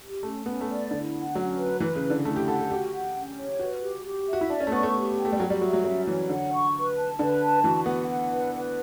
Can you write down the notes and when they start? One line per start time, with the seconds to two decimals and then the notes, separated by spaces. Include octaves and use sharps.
0.01 G4
0.23 A3 C#4
0.46 B3 C#4
0.61 A3
0.68 D5
0.91 D3 E4
1.13 F#5
1.35 F#3 C#4
1.58 B4
1.80 E3 B4
1.96 C#3
2.03 E4
2.10 D3
2.25 A3 E4
2.36 G4
2.48 A4 F#5
2.60 A4
2.70 F#4 G4
2.93 F#5
3.15 C#4
3.38 C#5
3.59 F#4 B4
3.82 G4
4.05 G4
4.28 E5
4.33 F#4
4.41 E4
4.50 D4 D5
4.60 C#4
4.67 A3
4.72 B3 C#6
4.83 A3
4.95 G4
5.17 G5
5.25 A3
5.32 G3
5.39 F#3 F#4
5.50 G3
5.62 F#3 E5
5.73 F#3
5.84 F#3 C#4
6.06 E3 C#5
6.29 D3 F#5
6.52 C#6
6.74 B4
6.96 A5
7.19 D3 B4
7.41 A5
7.64 E3 F#4
7.86 B3 F#5
8.08 F#5
8.32 B4
8.54 B4